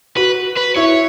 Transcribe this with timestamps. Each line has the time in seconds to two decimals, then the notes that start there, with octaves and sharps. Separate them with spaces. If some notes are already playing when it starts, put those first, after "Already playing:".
0.17 F#4 B4
0.57 B4
0.76 E4 C#5